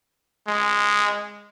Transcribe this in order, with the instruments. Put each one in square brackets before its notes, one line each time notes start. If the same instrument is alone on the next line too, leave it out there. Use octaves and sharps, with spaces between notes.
[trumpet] G#3